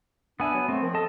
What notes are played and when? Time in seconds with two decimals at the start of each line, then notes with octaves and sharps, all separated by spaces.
0.40 B3 D4 E5 G#5
0.54 F#3
0.69 A3 C4
0.82 D#3 F3
0.95 A4 D#5 A5